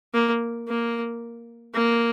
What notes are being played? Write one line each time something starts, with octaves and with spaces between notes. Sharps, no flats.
A#3
A#3
A#3